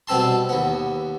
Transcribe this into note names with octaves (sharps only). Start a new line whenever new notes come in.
B2 G3 C4 A4 A5 C6
D#2 B3